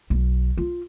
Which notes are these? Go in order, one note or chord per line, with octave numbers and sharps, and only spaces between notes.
B1
F4